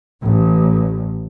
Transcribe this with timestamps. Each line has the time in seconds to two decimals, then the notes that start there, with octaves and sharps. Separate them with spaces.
0.23 A1